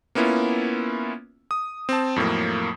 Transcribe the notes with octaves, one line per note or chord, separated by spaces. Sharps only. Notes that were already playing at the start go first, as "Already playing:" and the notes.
A#3 B3 C#4 E4 F4
D#6
C4 A5
F2 A2 F#3 A#3